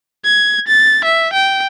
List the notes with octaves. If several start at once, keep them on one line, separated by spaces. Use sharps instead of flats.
G#6
A6
E5
G5